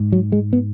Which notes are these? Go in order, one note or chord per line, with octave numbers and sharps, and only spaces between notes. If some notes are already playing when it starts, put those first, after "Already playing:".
Already playing: G#2
F#3
G#3
B3